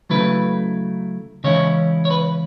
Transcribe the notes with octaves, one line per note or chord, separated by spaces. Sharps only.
C#3 F#3 A3 E4 B4
C#3 E3 G#3 C#4 E4 C#5
C#5
B4